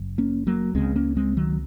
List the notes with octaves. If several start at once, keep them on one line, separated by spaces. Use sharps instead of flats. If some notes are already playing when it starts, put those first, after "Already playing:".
Already playing: F#1 F#2 C#3
A#3 C#4
F#3 A#3
C#2 C#3 G#3 C4
A#3 C#4
G#3 C4
D#3 F#3